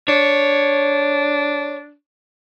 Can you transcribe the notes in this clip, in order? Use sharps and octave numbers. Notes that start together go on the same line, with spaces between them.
D4 C#5